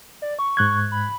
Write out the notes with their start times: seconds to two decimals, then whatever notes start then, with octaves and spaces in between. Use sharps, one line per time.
0.22 D5
0.39 C#6
0.57 G#2 F#6 G#6
0.92 B5